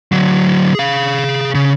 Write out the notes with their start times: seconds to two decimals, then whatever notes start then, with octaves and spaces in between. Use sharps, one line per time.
0.12 D3 F#3
0.75 G#4 F5
1.55 C#3